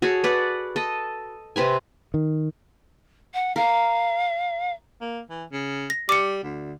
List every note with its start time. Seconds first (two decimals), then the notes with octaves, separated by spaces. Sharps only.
0.02 F#4 G#4 A4 C#5
0.24 B4 D5 F#5
0.76 A4 D#5
1.56 C3 C4 B4 G#5
2.14 D#3
3.34 F#5
3.56 A#4 F5
5.01 A#3
5.30 E3
5.52 C#3
5.90 A#6
6.09 G3 D6 C#7
6.43 D2